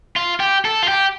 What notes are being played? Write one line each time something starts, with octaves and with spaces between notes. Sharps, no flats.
F4
G4
A4
F4
G4